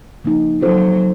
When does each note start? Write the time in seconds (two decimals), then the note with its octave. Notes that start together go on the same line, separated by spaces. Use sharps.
0.24 C#3 F3 A#3 D#4
0.62 F#3 C4 F4 A4 C5